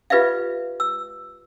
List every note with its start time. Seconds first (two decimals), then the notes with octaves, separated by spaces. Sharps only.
0.10 F4 G4 B4 D5 E5 F5
0.80 E6